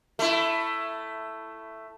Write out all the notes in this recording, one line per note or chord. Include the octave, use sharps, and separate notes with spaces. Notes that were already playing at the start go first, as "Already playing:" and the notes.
A3 E4